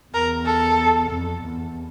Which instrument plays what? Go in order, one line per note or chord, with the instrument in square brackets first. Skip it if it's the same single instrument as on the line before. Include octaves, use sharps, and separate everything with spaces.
[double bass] E2 [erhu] A#4
[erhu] A4
[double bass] F2
E2